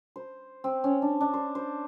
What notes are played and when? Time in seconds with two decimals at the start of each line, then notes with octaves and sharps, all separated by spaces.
0.16 C5
0.64 C4
0.84 C#4
1.02 D4
1.21 D4
1.33 C5
1.55 C5